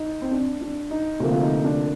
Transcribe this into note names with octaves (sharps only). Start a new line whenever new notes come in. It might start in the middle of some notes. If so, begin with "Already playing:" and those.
Already playing: D#4
C4
D4
D4
D#4
D2 C3 F3 A#3
F4
D#4
D4